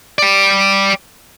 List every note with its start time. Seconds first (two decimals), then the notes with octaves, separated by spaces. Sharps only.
0.18 D5 G5